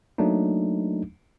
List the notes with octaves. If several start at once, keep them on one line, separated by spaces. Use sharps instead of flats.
F#3 A3 A#3 D4 D#4